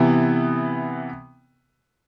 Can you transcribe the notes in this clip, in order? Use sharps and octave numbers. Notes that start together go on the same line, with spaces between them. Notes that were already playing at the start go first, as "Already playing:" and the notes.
Already playing: C3 E3 B3